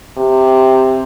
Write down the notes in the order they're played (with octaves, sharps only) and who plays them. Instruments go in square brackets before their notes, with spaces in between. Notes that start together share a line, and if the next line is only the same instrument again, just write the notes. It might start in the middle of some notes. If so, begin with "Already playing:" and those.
[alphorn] C3